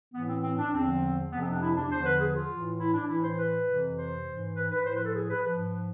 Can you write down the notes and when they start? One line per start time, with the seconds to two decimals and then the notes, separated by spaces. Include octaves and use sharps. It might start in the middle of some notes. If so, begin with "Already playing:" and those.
0.14 A2 E3 B3
0.29 C4
0.43 C4
0.58 D4
0.73 E2 D3 F3 C4
1.32 F2 C3 F3 B3
1.42 C4
1.51 D4
1.61 E4
1.76 D4
1.91 E2 D3 F3 C5
2.05 B4
2.21 G#4
2.35 F4
2.49 A2 E3
2.80 E4
2.94 D4
3.09 A2 E3 E4
3.24 C5
3.39 B4
3.68 F2 C3 E3
3.97 C5
4.27 G#2 E3
4.56 B4
4.71 B4
4.85 A2 C5
4.89 F3
4.96 B4
5.05 A4
5.15 G#4
5.30 B4
5.44 G#2 F3 B4